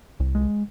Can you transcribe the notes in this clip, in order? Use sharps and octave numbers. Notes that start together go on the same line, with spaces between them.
C2
G#3